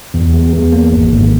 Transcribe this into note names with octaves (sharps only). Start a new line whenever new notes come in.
E2
E2
E2
A#3
G#1
G#1